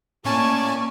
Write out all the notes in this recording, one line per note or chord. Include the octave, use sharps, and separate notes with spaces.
A2 A#3 C#4 D5 G#5 A5 C#6